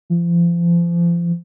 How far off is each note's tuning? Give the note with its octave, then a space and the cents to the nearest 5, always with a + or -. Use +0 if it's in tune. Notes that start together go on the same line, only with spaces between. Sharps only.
F3 -35